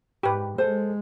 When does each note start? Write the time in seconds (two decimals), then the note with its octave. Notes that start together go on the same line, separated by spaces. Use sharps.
0.23 G#2 G4 B4
0.58 G#3 A4 C5